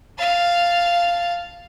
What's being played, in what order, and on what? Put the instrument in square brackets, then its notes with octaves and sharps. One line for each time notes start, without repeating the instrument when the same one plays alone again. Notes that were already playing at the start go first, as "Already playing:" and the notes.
[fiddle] F5 A5